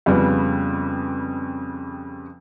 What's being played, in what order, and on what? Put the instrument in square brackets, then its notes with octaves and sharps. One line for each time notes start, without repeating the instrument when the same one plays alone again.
[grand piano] F2 C#3 G3 B3